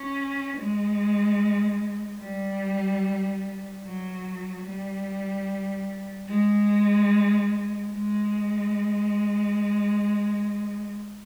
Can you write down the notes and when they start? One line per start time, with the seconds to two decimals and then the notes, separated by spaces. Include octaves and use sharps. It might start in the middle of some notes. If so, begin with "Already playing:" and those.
Already playing: C#4
0.57 G#3
2.20 G3
3.84 F#3
4.65 G3
6.29 G#3
7.92 G#3